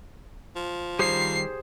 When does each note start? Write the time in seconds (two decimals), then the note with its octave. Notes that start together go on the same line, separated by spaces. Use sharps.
0.56 F3
0.99 D#3 G3 G4 G#4 C5 C7